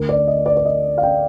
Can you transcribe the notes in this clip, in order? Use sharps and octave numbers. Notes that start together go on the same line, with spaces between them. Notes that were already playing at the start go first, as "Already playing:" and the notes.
Already playing: D2 D3 A#4
D5
D#5
D5
D5
D#5
F5
G5